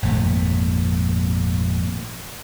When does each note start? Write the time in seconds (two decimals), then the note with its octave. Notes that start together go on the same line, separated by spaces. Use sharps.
0.02 G#1 F2 A#2 A3